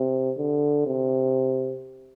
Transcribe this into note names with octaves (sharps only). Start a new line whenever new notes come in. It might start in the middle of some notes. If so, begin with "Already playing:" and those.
Already playing: C3
D3
C3